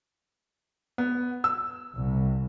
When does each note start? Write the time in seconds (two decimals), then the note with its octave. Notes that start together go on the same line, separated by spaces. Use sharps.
0.98 B3
1.44 E6
1.95 C2